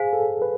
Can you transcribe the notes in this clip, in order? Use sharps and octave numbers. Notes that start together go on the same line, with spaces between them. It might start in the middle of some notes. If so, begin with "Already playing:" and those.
Already playing: G#4 C5 F5 G#5
A4
B4